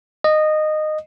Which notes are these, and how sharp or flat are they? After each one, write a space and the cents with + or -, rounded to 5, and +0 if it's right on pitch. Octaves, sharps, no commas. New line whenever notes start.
D#5 -15